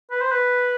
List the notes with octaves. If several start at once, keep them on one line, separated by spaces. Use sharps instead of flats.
B4
C5
B4